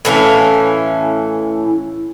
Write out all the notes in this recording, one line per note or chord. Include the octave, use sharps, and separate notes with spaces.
A2 E3 C#4 F5